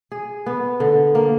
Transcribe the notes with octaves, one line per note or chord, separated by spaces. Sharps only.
G#4
B3
D3
A#3